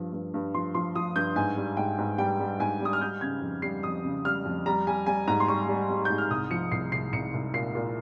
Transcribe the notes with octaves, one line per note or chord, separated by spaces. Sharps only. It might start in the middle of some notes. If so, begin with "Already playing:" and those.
Already playing: G2 F3
G2
G2
F3 C6
F3 C6
F3 D#6
G2 G6
G#2 G#5
G3
G#2 G5
G#2
G3 G5
G3
G#2 G#5
G3 D#6
F6
G3 G6
C#3 G#6
F2
G3 C7
F2 D#6
C#3
G3 F6
F2
G3 A#5
G3 G#5
G3 G#5
G#2 A#5
C6
G3 C#6
G3
G3
G#2 G6
F6
C2 D#6
F3 C#7
C2 C7
C2 C7
C2 C#7
C2
A#2 C7
A#2